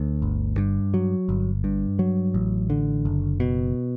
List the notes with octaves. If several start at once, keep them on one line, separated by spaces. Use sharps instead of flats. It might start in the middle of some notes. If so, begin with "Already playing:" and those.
Already playing: D2
G1
G2
F#3
G1
G2
F#3
A1
D3
F#1
B2